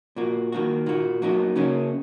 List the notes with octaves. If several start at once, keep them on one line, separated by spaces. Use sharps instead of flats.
A#2 A#3 F#4
D#3 A#3 F#4
A#2 A#3 F#4
F#3 A#3 D#4 F#4
C#3 A#3 C#4 F#4